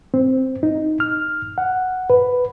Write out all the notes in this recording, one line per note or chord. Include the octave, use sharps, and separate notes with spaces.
C4
D#4
F6
F#5
B4